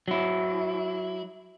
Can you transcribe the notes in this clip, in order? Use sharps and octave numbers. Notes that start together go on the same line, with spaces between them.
F#3 E4